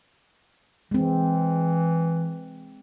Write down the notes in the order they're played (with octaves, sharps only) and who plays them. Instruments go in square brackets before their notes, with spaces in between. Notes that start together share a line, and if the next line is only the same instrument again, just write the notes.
[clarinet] E3 [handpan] G#3 C4